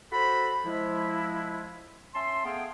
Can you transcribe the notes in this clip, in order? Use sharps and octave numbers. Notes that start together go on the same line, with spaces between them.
F#4 A4 C5 B5
F3 G#3 E4
C#4 E5 A5 C6
A3 B3 G#4 F5 G5